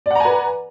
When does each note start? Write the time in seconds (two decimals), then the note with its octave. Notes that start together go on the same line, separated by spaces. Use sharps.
0.06 D5
0.11 F#5
0.15 A#5
0.20 G#5
0.25 B4